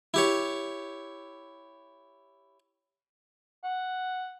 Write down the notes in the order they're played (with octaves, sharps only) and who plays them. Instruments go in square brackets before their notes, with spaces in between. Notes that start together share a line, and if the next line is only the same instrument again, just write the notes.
[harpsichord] E4 G4 C#5
[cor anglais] F#5